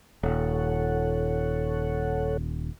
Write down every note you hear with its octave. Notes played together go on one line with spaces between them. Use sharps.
D#1 A4 C#5 F#5